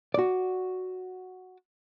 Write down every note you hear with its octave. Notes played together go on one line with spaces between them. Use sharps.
F#4 D5